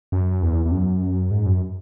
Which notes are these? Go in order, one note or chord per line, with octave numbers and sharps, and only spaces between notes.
F#2
E2
E2
F#2
G#2
F#2